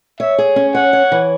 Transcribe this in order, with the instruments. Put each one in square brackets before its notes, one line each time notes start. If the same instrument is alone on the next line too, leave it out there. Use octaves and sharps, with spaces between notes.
[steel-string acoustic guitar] C#5 [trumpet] E5
[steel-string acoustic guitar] G#4
C#4
[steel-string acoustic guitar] C#5 [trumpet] F#5
[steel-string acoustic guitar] C#5
E3